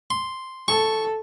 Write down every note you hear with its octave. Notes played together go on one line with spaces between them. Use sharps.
C6
A4 C#6